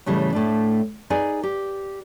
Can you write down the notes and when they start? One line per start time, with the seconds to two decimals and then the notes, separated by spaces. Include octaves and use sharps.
0.06 A2 C#3 E3 G3 A3
0.33 A2 A3 D4
1.10 D#4 G#4 B4 D5 G#5
1.43 G4